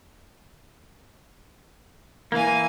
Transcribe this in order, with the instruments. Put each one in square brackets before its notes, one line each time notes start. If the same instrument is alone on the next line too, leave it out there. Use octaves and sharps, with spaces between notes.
[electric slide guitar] E3 A#3 [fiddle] F5 G#5